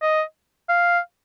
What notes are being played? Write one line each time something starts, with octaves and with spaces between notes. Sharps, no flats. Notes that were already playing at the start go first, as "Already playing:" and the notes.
D#5
F5